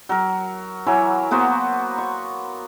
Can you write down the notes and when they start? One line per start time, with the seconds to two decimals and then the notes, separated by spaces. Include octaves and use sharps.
0.09 F#3 A#4
0.87 E3 F#3 C#5
1.31 A#3 B3 F#4 C5
1.98 C#6